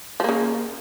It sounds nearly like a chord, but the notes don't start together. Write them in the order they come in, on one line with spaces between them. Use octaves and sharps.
F3 A#3 C#3